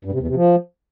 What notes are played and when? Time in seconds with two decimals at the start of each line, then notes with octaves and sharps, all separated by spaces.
0.05 G2
0.12 C3
0.20 E2
0.28 C3
0.35 F3